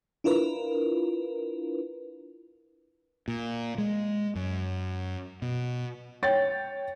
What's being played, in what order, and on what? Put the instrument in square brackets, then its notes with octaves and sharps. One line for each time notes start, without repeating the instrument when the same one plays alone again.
[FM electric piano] D4 E4 F4 A#4 B4
[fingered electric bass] A#2
G#3
F#2
B2
[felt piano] C#5 G5 A6